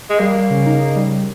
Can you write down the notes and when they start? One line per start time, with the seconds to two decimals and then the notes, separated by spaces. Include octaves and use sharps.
0.10 G#3
0.19 G3 A#3
0.35 G3
0.50 C#3
0.66 D#4
0.81 C#3
0.96 G3
1.11 G3